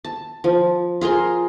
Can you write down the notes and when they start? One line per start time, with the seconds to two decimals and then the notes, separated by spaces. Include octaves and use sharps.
0.05 A5
0.44 F3
1.01 F4 G#4 A#4 C6